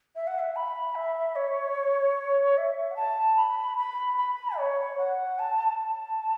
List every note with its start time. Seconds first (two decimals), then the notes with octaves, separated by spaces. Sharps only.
0.15 E5
0.27 F#5
0.39 E5
0.55 B5
0.95 E5
1.35 C#5
2.57 E5
2.91 F#5
2.96 A5
3.36 B5
3.77 B5
4.17 B5
4.58 C#5
4.98 F#5
5.39 A5
5.78 A5